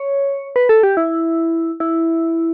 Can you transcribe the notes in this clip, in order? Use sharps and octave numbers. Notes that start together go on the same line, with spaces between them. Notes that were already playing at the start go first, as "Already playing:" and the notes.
Already playing: C#5
B4
A4
G4
E4
E4